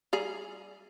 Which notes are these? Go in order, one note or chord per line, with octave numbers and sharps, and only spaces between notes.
G3 G#4 A#5